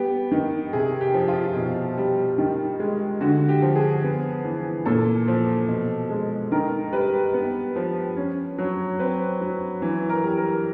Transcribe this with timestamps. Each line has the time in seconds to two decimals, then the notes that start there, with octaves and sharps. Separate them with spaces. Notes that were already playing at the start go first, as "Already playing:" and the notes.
Already playing: G3 B3 G4
0.32 D#3
0.73 C3 G#4
1.01 G4
1.14 F3
1.28 F4
1.55 B2
1.97 G3
2.38 D#3
2.80 G#3
3.21 D3 F#4
3.48 G4
3.62 F3
3.76 G#4
4.04 B3
4.45 E3
4.86 A#2 A4
5.28 F3
5.68 B2
6.10 G#3
6.52 D#3 A#4
6.92 G3 B4
7.34 B3
7.76 F3
8.16 C#4
8.58 F#3
8.99 C4 B4
9.41 F#3
9.82 E3
10.09 A#4
10.23 G3
10.37 A#4